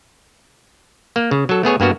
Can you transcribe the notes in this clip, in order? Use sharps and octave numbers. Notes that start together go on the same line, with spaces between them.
A#3
C#3
F#3 A4
A3 B3 G#4 C#5
G2 A#3 B3 F#4